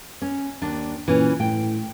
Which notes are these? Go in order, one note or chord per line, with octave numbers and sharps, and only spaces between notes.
C#4
D#2 D4
A#2 E3 C#4
A2 G5